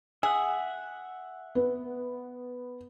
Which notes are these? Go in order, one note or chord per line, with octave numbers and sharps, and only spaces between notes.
G#4 E5 F#5
B3